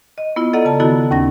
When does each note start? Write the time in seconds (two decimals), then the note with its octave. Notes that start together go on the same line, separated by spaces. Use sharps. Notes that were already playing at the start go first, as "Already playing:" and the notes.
0.18 D#5
0.36 B3 E4 F4
0.53 A4 D5 D#5 F#5 A#5
0.65 C#3 A5
0.80 D#3 B3 E4 F#4 A4
1.11 D#2 C#4 A#6